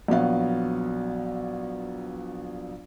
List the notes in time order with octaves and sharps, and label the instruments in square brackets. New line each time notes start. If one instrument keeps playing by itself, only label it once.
[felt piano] A#1 F#3 B3 F5